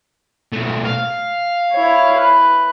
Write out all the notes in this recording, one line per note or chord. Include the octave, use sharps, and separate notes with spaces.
B1 A3
F5
E4 C#5
B4